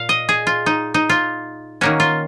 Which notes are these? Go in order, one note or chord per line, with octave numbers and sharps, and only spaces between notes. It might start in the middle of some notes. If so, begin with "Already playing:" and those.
Already playing: A#2 F5
D#5
G#4
F4
D#4
D#4
F4
D#3 A#3 C#4 F#4
F4